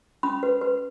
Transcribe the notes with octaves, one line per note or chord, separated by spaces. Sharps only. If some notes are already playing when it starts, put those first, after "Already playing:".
C#4 B5
B4
B4